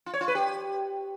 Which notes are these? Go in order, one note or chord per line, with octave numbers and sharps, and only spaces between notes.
F4
C#5
F4
B4
G4